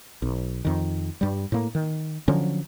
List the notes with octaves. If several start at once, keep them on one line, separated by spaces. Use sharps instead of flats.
B1
F2 D#3
G2 G3
A2 A#3
D#3
D3 F3 F#3 C#4